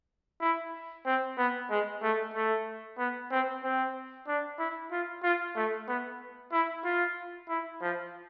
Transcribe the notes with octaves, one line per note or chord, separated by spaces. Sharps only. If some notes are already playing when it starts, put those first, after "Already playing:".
E4
C4
B3
G#3
A3
A3
B3
C4
C4
D4
E4
F4
F4
A3
B3
E4
F4
E4
F3